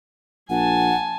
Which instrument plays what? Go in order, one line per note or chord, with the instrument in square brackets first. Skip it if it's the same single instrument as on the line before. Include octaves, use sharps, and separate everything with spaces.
[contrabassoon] A#1 [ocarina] F#5 [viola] G#5 A5